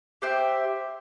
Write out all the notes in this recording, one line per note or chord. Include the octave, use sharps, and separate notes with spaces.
G4 C5 E5 G5